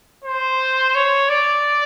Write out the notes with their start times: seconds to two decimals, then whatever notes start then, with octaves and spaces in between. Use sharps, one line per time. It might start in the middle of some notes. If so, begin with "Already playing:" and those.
0.25 C5
0.95 C#5
1.29 D5